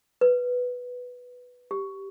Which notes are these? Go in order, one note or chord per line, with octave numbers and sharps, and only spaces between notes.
B4
G4